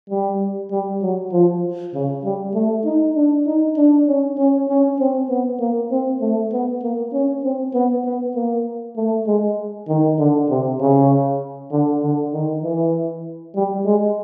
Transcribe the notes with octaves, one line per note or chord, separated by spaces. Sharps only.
G3
G3
F#3
F3
C#3
G3
A3
D#4
D4
D#4
D4
C#4
C#4
C#4
C4
B3
A#3
C4
A3
B3
A#3
C#4
C4
B3
B3
A#3
A3
G#3
D#3
D3
C3
C#3
D3
D3
D#3
E3
G3
G#3